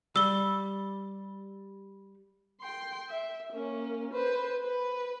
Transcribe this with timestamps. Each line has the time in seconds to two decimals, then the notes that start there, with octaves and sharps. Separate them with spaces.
0.16 G3 E6 G7
2.61 G5 C6
3.09 E5
3.53 A#3 C#4
4.13 B4 C5
4.61 B4